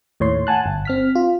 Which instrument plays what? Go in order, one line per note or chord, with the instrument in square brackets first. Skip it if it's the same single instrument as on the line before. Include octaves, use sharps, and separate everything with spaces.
[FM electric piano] D#2 A2 C#5 C6
F#5 G#5 A5 F#6
G1
C4 F6 B6
F4